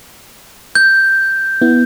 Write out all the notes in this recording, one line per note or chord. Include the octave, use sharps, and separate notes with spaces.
G6
B3 E4